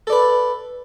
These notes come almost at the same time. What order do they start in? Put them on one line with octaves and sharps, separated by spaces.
A4 D5 B4